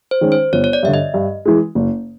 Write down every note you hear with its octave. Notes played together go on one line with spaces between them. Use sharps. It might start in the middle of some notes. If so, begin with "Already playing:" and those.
C5
D#3 G#3 C#4
C5
G1 C#5
C#5
D5
G2 D3 E5
D#5
G2
E3 G#3
F#1